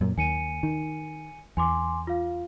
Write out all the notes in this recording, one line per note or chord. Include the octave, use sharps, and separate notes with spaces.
F#2 A#2
D#2 G#5 C#7 D#7
D#3
E2 G#5 C6 D6
F4 F5